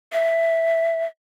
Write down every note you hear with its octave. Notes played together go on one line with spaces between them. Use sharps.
E5